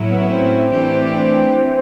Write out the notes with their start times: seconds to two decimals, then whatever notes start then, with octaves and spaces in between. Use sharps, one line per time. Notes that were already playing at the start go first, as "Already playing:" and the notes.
Already playing: A2 F#3 A#3 C#4 E4
0.09 B3
0.20 B3
0.29 C4
0.70 E3 A3 D4 G4
1.11 C4
1.51 E3